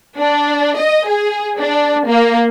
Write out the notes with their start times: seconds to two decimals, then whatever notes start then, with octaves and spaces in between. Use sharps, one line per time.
0.17 D4
0.79 D#5
1.07 G#4
1.58 D4
2.08 A#3